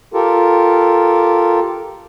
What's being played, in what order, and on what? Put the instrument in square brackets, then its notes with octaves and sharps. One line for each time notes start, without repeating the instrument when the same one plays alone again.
[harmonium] F4 G4 A4 A#4